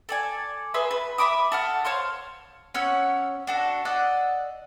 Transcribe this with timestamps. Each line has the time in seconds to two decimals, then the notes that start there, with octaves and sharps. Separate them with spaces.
0.09 A4 D5 G#5
0.74 G#4 B4 E5 C6
0.91 B4
1.18 E5 B5 D6 D#6
1.52 A4 F#5 F6
1.85 C5 C#5 F5 C6
2.74 C#4 C#5 F#5 E6
3.47 D4 F#4 A4
3.85 D5 D#5 F#5 E6